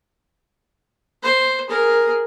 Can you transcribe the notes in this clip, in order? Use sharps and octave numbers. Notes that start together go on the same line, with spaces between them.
C5
G#4 A#4